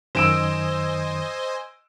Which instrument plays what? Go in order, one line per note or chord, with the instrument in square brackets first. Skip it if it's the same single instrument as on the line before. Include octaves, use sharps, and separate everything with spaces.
[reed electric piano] F#2 D#3 [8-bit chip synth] C5 D#5 G#5 [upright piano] E6 D7 E7